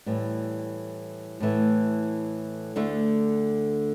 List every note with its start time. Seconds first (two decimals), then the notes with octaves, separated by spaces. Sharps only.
0.06 A2 E3 G3
1.41 A2 E3 A3
2.76 D2 D3 A3